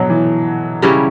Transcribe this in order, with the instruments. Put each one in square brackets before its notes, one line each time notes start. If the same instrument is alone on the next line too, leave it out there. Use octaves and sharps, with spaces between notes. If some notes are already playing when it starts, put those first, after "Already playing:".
Already playing: [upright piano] B2 F#3
E3
[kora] C#3 G3 C#4 E4